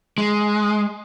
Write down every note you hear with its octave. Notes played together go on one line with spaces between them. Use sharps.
G#3